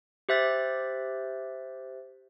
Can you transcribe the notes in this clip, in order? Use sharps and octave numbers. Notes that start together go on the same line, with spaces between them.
G4 C5 E5 F#6 A6